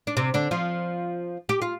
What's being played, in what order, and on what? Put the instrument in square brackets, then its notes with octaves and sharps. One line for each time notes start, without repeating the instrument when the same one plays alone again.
[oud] D4
C3 C4
D3 D4
F3 F4
G4
F4